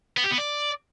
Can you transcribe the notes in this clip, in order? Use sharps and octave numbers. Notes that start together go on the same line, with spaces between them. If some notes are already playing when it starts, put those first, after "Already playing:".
B3
G4
B3
D5